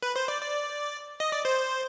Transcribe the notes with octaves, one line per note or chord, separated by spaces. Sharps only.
B4
C5
D5
D5
D#5
D5
C5